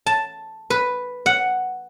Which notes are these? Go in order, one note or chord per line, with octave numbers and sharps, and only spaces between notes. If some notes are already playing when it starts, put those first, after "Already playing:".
A5
B4
F#5